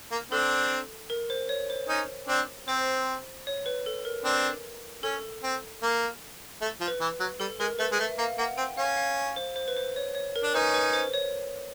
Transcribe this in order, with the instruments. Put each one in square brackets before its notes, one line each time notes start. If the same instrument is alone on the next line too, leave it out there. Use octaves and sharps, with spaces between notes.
[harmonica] A#3
[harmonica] C4 D4 [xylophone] A4
[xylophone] A#4
C5
C#5
C5
[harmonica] C#4 D#4
C4 D4
[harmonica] C4 [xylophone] C5
[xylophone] C#5
B4
A4
A#4
[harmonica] C4 D4
[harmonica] C#4 [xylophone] A4
[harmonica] C4
A#3
A3
F3
[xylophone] B4
[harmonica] E3
F#3
[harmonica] G3 [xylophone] A4
[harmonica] G#3 [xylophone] A#4
[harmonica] A3 [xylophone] B4
[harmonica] G#3
[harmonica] A3 [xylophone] E5
[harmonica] A#3 [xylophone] F5
[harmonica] A#3 [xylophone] F#5
[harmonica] C4 [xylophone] G5
[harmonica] C#4 [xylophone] F5
[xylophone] F5
C5
C5
B4
C5
C#5
C#5
A#4
[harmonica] D4
[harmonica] C#4 D#4 [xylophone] B4
[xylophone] B4
C5
C#5